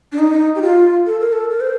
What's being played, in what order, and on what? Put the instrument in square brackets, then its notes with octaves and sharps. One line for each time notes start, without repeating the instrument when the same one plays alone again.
[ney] D4
D#4
G4
F4
A4
A#4
A4
A#4
C5